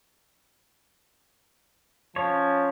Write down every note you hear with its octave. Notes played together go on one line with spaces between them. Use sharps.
F3 C#4 C#5